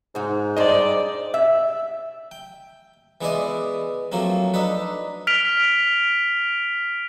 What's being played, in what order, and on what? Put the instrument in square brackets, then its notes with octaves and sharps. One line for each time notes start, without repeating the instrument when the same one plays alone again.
[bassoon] G#2 [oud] D#4 F#4
[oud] G2 C5 [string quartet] D5 [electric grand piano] D#5
[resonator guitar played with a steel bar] E5
[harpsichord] G5
E3 G#3 B3 E4 D5 D#5
F3 F#3 A3 A#3 C4
D4 D#4 A4 B4
[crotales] F6 B6 D7 F7